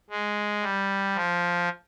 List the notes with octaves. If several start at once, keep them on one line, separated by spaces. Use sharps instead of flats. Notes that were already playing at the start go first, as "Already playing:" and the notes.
G#3
G3
F3